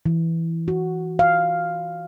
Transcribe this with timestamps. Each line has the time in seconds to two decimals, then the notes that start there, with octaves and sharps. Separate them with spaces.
0.06 E3
0.68 F#4
1.19 F5